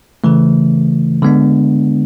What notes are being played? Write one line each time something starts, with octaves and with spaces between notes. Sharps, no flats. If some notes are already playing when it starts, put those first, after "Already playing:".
C#3 E3 A3
D3 G#3 B3 D4